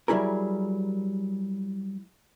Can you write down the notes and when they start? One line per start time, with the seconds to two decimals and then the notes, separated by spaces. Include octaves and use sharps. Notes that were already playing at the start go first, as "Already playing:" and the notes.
0.08 F#3 G3 E4 G#4 A#4